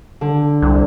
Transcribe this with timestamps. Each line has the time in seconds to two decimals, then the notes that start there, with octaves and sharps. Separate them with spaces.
0.21 D3
0.62 C2